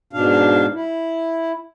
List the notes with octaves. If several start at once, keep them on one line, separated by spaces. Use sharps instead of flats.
G#2 B2 D4 F5
E4